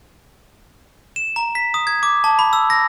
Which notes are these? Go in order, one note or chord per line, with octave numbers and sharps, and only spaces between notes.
E7
A#5
B6
D#6
G#6
D6
A5
B5
E6
A#6